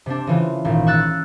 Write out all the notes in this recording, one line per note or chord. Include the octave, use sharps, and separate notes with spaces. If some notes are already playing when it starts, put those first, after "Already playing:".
C3 C4 D4
C#3 E3 F4
G#1 A#2
C#6 E6 F#6 A6